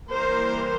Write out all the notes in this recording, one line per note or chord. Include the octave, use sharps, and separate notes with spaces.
E3 G3 A#3 A#4 C5